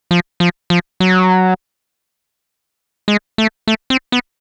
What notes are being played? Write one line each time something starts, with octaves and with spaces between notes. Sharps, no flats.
F3
F3
F3
F#3
G#3
A3
A3
C4
B3